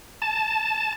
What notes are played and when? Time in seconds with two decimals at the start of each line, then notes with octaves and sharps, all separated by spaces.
0.22 A5